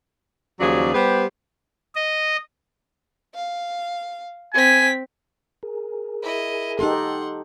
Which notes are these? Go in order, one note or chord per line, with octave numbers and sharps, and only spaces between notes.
D#2 C#3 F3 F#3 G#4 D5
G3 B3 G4 B4 C5
D#5
F5
C4 G#5 B6
G#4 A#4
E4 D#5
D#4 G4 A4 F#5 C6